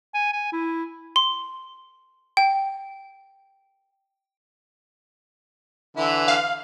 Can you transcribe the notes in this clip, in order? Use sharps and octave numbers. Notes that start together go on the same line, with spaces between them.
G#5
G#5
E4
C6
G5
D3 E3 E4
F5